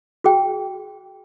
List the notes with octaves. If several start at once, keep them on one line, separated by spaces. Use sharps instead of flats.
F#4 G#4 G5